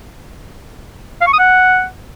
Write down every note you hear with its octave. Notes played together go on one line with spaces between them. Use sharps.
F5
C#6
D#6
F#5